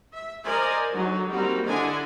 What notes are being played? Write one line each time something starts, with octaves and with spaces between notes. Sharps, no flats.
E5
A#4 C5 D5 D#5 G#5
D3 F#3 D#4
G3 A#3 C4 F#4
D3 D4 E4 D#5 G#5